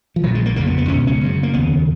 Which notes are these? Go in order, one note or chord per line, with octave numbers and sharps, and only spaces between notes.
F3
A#1 A#2 F#3
G#3
A#3
F#1 F2 C#3 A#3
B3
B3
C#2 B2 C#4
C#4
F#1 F#2 C#3
A#3
F1 D#2 C#3 B3